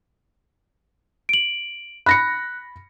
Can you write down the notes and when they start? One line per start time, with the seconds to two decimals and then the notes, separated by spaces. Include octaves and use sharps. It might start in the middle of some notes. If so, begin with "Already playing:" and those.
1.29 D7 F#7
2.06 B5 F#6 A#6 C#7